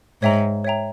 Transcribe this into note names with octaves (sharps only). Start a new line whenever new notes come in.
G#2 C#5 E5 G5 A#5
C#5 E5 G5 A#5